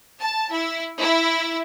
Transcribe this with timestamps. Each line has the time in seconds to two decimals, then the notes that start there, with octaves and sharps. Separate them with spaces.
0.20 A5
0.51 E4
0.99 E4